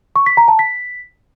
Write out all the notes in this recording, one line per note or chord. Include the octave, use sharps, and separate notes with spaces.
C#6
B6
A#5
A5
B6